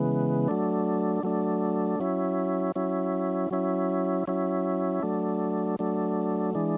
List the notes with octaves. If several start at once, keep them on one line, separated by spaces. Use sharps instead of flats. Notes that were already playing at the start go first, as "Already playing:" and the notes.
Already playing: C#3 E3 G#3 B3
F#3 A3 D4
F#3 A3 D4
F#3 C#4 E4
F#3 C#4 E4
F#3 C#4 E4
F#3 C#4 E4
F#3 A3 D4
F#3 A3 D4
E3 G#3 D4